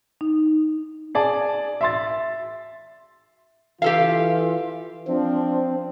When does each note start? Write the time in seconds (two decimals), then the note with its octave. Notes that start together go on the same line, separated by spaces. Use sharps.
0.21 D#4
1.15 G#4 D5 A5
1.81 E5 C6 A6
3.82 E3 F4 G4 A4 F5
5.07 F3 C4 D4